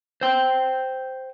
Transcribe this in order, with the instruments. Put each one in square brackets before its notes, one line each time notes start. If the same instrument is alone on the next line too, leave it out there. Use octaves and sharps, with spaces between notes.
[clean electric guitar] C5 G5